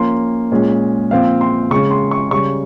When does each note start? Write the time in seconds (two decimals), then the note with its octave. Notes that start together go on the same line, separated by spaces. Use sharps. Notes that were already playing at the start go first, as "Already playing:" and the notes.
Already playing: F3 A#3 C#4 C6
0.51 A#2 G#3 C#4
1.11 A#2 F3 C4 F5
1.41 C6
1.71 C#3 G#3 C#4 C#6
1.91 C6
2.11 C#6
2.31 C#3 G3 C#4 C#6